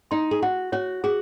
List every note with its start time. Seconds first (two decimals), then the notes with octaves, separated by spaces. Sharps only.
0.11 D#4 C6
0.31 G#4
0.42 F#4 F#5
0.72 F#4 C#5
1.04 F#4 G#4